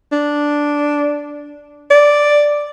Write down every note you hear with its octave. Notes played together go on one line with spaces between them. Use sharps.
D4
D5